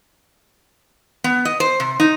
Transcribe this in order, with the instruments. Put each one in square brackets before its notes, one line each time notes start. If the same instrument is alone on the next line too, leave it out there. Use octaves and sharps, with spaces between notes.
[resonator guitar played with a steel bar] B3
D#5
C5
C3
D#4